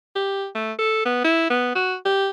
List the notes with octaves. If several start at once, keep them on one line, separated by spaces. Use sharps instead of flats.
G4
A3
A4
B3
E4
B3
F#4
G4